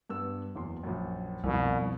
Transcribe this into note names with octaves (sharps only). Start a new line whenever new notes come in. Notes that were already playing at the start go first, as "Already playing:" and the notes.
G2 B3 E6
F#1 E2 C6
A#1 F#2
C2 F2 B2